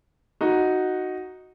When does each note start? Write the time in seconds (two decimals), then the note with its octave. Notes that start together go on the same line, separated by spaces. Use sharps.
0.41 D#4 F#4